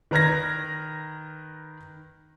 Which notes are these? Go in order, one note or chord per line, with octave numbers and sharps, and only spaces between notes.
D#3 B4 A#5 F6 G#6 A#6